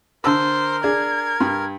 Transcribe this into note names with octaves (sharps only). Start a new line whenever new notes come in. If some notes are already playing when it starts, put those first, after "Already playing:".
D3 A#4 C5 A5 E6
D4 G#4 G#6
G2